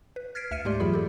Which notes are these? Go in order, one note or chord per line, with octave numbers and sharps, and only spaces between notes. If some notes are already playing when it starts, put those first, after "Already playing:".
B4
F6 G#6 A6 B6 C7 D7
D2 E5 F6 C#7 D#7
G#2 G#3 A3 G4 D5 C6
F2 E3 F#3 F4 G#4 B5
G4 A4